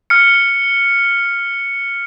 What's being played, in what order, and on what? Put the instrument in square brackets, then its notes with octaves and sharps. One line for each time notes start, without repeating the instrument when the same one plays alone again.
[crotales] F6 C#7